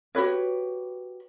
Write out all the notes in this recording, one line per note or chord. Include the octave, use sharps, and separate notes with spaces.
F#4 G4 B4 C#5